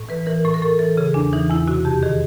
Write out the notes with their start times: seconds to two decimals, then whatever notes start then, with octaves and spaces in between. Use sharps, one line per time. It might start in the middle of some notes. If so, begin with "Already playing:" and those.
Already playing: A2
0.09 E3 B4
0.26 E3 A#4
0.45 A2 A4
0.54 A#4
0.62 A2 A4
0.79 E3 A4
0.97 C#3 G#4
1.14 E2 D4
1.33 E3 D#4
1.50 E2 E4
1.68 C3 F#4
1.85 F2 G4
2.03 D#3 G#4